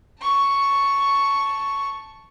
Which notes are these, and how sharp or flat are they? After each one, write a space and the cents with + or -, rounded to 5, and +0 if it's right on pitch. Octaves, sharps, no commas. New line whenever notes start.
A5 +0 C#6 +0